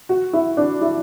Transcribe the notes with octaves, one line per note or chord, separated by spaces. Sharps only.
F#4
E4
D4
E4